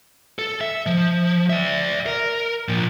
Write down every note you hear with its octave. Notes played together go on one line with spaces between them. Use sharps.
A4
E5
F3
D5 E5
A#4
A#2 F3